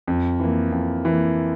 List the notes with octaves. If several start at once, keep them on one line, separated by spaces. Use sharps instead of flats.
F2
E3 A#3
F2
E3 A#3